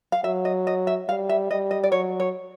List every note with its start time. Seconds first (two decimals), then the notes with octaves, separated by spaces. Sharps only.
0.12 F5
0.24 F#3 E5
0.45 D#5
0.67 D#5
0.87 E5
1.09 G3 F5
1.29 E5
1.51 G3 D#5
1.71 D#5
1.84 D5
1.92 F#3 C#5
2.20 C#5